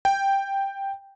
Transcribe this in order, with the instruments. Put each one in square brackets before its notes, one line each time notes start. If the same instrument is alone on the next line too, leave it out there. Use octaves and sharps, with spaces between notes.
[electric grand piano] G5